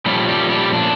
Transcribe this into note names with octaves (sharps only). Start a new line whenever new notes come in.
A#2 F3 G3 A3 C#4 G4
G3 G4
G3 G4
D4